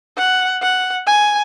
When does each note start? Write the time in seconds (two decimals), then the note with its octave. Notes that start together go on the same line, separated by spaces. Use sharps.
0.18 F#5
0.62 F#5
1.07 G#5